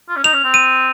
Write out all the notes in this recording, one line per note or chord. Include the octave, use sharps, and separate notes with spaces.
F4
C#4
D#4 F7
C#4
C4
D#7